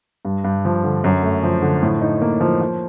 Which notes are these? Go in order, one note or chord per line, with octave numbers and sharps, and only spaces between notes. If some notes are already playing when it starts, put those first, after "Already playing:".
G2
G2
F3
D3
F#2
A3
F3
D3
A2
D#4
A#3
F3
F3